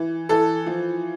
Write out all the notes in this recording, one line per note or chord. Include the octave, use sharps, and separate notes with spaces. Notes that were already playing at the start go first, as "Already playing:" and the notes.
Already playing: E3
E3 A4
F3